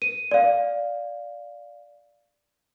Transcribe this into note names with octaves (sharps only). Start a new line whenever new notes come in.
D#7
D5 F5